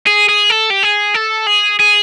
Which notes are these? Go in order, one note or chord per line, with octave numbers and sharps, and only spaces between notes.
G#4
G#4
A4
G4
G#4
A4
G#4
G#4